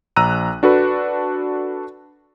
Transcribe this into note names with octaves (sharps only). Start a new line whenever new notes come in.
A#1 A#5 E6 F#6 D#7
D4 F#4 A4 B4